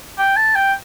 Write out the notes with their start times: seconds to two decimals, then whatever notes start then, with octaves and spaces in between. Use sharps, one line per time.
0.18 G5
0.36 A5
0.55 G5